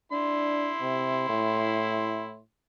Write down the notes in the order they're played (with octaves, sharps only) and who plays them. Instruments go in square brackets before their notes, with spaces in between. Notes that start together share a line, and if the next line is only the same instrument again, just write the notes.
[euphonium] D4 [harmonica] E4 C6
[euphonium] C3
A2